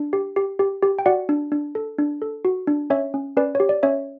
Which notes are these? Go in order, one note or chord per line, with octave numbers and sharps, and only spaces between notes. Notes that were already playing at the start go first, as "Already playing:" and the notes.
Already playing: D4
G4
G4
G4
G4
G5
F#4 D5 F#5
D4
D4
A4
D4
A4
F#4
D4
C#4 C#5 E5
C#4
C#4 B4 D5
G4 C#5
D5
C#4 C#5 E5